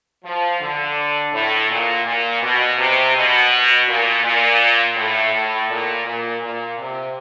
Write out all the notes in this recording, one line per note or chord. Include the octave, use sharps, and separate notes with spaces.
F3
D3
A2
A#2
A#2
B2
C3
B2
A#2
A#2
A2
A2
A#2
A#2
A#2
C3